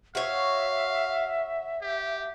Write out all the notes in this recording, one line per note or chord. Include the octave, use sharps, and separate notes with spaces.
F#4 C#5 E5 F5
G4